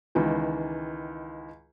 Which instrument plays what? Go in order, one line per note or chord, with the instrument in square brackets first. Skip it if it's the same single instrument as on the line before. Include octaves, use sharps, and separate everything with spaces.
[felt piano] C#2 D#3 E3